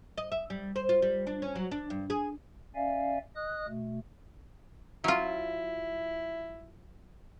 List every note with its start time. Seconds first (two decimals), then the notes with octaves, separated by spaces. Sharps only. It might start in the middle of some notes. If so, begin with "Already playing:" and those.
0.18 D#5
0.32 E5
0.50 G3
0.76 C5
0.89 F4
1.02 G3
1.27 D4
1.42 C#4
1.55 F#3
1.71 D4
1.90 G2
2.10 G#4
2.75 C#4 D5 E5 F5 G#5
3.36 D#5 D#6 F#6
3.68 B2 A3
5.04 F#3 E4 F4